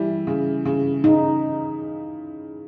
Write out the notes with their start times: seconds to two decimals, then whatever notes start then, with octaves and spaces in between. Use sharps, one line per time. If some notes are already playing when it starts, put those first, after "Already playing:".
Already playing: E3 G3 E4
0.27 C#3
0.65 C#3
1.04 C#3 D#4